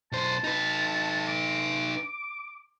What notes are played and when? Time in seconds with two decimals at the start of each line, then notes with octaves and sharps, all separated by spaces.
0.12 B1 C5 A5
0.44 D#4 B4
1.28 D6